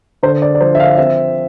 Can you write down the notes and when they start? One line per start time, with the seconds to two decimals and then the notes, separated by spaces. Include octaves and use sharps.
0.23 D3 C5
0.42 D5
0.55 D5
0.61 F3 C5
0.75 E5
0.80 F5
0.97 C4 E5